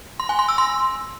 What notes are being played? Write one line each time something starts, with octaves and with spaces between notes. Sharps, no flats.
C6
G#5
C6
E6
C6